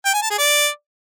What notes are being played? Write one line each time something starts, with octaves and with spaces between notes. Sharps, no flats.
G5
G#5
A5
G#4
D5